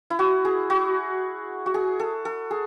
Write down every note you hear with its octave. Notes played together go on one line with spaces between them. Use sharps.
E4
F#4
G#4
F#4
F#4
G#4
A4
A4
G#4